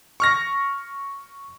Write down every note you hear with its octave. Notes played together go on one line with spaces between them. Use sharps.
C#6 F6 A#6